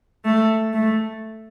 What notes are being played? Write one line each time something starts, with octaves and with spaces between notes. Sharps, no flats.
A3
A3